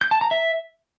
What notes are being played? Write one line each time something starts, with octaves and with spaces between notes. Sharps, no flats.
G6
A5
A#5
E5